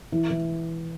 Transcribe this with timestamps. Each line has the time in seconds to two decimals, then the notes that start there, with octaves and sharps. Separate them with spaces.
0.12 E3 E4
0.30 E3